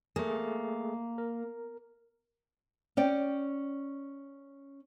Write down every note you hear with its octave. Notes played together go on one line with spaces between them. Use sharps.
A3 A#3 G#4
A#4
C#4 D5 G5